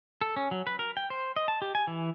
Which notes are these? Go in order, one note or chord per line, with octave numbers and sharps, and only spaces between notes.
A4
C#4
F#3
B4
A#4
G5
C5
D#5
A5
G4
G#5
E3